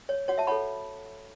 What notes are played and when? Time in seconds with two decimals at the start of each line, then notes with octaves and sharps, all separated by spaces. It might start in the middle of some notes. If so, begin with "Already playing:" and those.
0.09 C#5
0.28 F#4 C#5 F#5
0.38 E5 A5
0.47 A4 C#5 F#5 B5